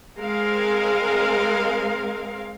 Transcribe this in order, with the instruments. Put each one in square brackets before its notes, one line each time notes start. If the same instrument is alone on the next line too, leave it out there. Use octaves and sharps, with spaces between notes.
[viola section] G#3 C4 A#4 F5